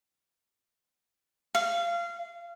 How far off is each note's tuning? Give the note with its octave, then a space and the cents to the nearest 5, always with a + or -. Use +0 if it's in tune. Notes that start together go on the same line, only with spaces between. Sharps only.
F5 -25